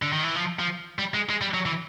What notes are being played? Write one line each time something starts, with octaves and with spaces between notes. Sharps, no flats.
D3
D#3
E3
F3
F3
G3
G#3
G#3
G3
F#3
E3